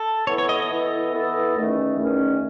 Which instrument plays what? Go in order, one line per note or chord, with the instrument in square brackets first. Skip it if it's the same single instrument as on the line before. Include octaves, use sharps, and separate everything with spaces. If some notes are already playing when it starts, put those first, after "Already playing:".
Already playing: [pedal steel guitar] A4
[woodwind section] E3 B3 E4 A4 [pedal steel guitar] C#5
[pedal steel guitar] C#5
D#5
D#5
[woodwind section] E3 B3 E4 A4
E3 B3 E4 A4
E2 D#3 A3 C#4
E2 D#3 A3 C#4